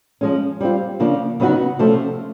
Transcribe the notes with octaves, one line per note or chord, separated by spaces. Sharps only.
F3 G#3 C#4
G3 C4 F4
C#3 F3 A#3 D4 F4
C#3 F#3 B3 D#4 F#4
C3 F3 A3 C#4